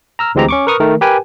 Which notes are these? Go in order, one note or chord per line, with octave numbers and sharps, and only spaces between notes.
A#5 E6 F6
D2 E3 G#3 C4 G4 A#5
C#4 C#6 D6
A#4 B4 C#6 D#6 F6
D#3 A3 A#4
G4 A#4 B4 G5 G#5